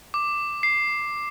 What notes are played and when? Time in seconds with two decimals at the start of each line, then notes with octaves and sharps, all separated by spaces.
0.14 D6
0.63 C7